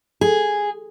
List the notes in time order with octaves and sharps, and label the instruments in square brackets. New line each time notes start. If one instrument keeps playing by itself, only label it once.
[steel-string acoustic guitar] G#4